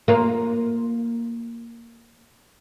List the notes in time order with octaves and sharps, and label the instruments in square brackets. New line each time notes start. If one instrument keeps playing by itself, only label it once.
[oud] A#3 F4